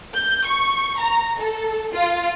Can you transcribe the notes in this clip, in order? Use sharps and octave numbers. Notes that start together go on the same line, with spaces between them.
G6
C#6
A#5
A4
F4